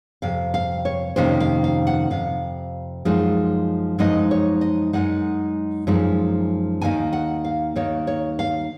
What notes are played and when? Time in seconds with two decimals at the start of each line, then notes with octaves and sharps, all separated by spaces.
0.22 F2 C3 F5
0.54 F5
0.85 C#5
1.16 F2 C3 D#3 A#3 C#4 C5
1.40 F5
1.64 F5
1.87 F#5
2.10 F2 C3 F5
3.05 F#2 F3 G#3 D#4
3.99 F#2 F3 G#3 D#4 D#5
4.31 C#5
4.61 D#5
4.93 F#2 F3 G#3 D#4 F#5
5.87 F#2 F3 G#3 D#4
6.81 D#2 D#3 A#3 D#4 G#5
7.13 F#5
7.44 F5
7.76 D#2 D#3 A#3 D#4 C#5
8.07 C#5
8.39 F5